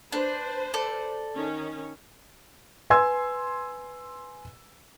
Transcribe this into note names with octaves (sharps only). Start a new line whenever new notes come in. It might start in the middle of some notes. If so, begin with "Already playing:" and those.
D4 B4 C5
A4 D5
D#3 C#4
B4 G#5 C6 E6 G#6